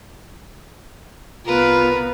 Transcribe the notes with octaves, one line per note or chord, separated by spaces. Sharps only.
C2 B3 F4 A#4 B4